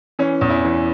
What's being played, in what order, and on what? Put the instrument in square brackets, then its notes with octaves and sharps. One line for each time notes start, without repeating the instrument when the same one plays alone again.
[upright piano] E3 C#4
E2
E4
E3